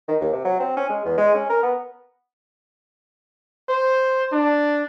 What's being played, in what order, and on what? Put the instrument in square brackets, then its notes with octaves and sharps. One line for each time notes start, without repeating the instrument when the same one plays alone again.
[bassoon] D#3
D#2
C3
F#3
C4
C#4
G#3
E2
G#3
C#4
A#4
B3
[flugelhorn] C5
D4